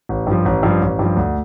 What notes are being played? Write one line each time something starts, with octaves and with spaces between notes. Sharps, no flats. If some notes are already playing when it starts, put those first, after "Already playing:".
A1
G2 F3
A1
G2 F3
A1
G2 F3
D2